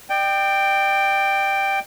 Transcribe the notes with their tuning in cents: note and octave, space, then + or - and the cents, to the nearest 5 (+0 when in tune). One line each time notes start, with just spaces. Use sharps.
D5 +40 G5 +0